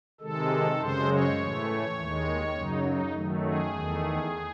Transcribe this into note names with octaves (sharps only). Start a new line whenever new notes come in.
C3 D#3 G#3 A4
F#2 C#3 G#3 C5
C#5
A2 E3 A3
D#2 D#3 G#3
F#2 C#3 F#3 D#4
D#4
F#2 D#3 F#3 A3
G#4
E2 D#3 A3